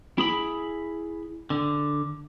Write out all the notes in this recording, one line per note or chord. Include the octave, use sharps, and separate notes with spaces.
E4 G#4 B5
D3